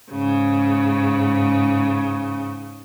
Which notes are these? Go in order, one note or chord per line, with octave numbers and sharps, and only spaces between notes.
G#2 C#3